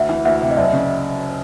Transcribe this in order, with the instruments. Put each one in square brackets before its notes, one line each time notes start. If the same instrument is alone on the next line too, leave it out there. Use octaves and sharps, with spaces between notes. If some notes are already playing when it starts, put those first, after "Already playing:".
Already playing: [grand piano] D2 [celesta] E5 F#5
[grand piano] E3
[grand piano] D2 [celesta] E5 F#5
[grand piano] C3
[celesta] D#5
[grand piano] F#1 [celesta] D5 E5
[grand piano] C#3